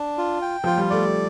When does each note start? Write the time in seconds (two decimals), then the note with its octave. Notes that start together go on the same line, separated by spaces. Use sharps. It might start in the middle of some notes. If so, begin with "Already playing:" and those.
Already playing: D4
0.18 F4
0.42 G5
0.64 F3 F4
0.77 G3
0.90 A3 D5